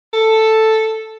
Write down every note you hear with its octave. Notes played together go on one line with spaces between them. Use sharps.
A4